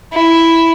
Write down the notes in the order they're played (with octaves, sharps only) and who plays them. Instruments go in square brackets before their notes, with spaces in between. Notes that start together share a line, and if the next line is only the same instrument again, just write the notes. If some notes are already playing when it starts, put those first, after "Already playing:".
[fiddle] E4